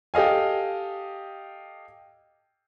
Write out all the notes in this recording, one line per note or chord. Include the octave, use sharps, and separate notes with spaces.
G4 A4 D#5 F5 G#5